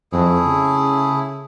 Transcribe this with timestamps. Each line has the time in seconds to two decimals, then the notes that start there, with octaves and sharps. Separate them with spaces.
0.12 F2 A3 E4 G#4
0.46 C#3